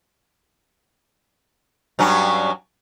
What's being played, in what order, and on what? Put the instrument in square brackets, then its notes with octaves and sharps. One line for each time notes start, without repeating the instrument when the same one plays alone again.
[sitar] G2 F#3 C#4